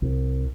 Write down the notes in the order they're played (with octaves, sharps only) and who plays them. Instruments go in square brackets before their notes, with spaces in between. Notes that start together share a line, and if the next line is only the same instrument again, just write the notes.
[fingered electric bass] C2